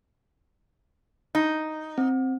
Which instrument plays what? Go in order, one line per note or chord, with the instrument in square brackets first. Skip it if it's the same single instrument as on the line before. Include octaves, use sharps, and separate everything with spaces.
[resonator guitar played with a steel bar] D#4
[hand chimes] C4